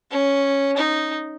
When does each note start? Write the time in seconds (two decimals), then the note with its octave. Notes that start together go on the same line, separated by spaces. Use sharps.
0.11 C#4
0.77 D#4